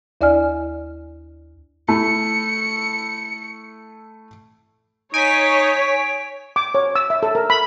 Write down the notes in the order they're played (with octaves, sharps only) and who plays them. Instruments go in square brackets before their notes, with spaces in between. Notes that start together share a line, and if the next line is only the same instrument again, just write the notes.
[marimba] D#2 E4 D5 D#5 G#5 F6
[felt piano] A3 E4 [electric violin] C#7
[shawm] D#4 [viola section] C#5 [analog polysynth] G#5 B6 [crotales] D7
[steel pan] D6
C#5
E6
E5
A4
A#4
B5